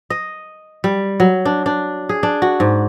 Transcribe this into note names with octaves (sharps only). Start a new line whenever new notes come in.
D#5
G3
F#3
D4
D4
G#4
D4
F#4
G#2